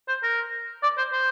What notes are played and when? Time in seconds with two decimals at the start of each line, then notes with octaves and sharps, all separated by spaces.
0.08 C5
0.23 A#4
0.83 D5
0.98 C5
1.12 C5